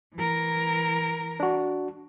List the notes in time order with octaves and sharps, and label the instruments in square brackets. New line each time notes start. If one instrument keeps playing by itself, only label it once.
[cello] E3 A#4
[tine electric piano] D4 F#4